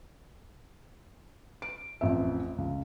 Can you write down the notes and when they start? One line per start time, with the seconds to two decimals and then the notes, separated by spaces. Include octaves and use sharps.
1.62 D7
2.01 A1 F2 E5
2.58 C#2